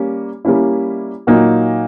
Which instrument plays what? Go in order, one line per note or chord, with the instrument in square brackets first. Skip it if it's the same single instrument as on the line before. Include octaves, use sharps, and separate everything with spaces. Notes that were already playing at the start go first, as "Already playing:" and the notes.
Already playing: [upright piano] G3 A#3 C#4
G3 A#3 C#4 E4
A#2 F#3 A#3 D#4